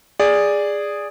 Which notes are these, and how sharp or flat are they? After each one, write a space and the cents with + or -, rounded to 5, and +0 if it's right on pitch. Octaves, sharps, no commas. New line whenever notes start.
G#4 -10 D5 +0